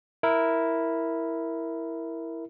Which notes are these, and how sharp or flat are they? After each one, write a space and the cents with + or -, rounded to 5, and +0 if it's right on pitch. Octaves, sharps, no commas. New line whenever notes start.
E4 +0 A#4 +0